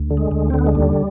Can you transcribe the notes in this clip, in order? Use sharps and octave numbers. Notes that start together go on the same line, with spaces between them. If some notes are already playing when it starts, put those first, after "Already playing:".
Already playing: D2
D3
G#3
D2
C4
D3
B3
G#3
D#2 G3